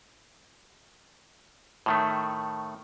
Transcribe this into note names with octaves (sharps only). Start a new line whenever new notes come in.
A2 D#3 A3